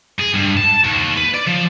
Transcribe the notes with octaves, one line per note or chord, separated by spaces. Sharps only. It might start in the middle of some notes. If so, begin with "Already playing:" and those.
G#4
G2
A5
D#2
B4
D5
F3